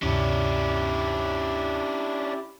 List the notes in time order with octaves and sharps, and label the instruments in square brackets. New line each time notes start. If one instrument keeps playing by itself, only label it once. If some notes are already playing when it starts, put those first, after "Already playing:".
[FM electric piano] D2 G2 C3 [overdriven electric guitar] C#4 D4 [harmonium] E4 G4